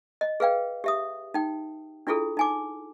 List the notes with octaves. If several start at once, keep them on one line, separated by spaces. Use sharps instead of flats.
D#5
G#4 B4 F5 G5
G4 E5 D#6
D#4 G5
D4 E4 F4 G#4 A4
D#4 G#5 D6